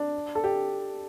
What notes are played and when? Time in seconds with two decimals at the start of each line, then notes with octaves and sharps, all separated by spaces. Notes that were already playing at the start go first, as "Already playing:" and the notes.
Already playing: D4
0.35 A4
0.44 G4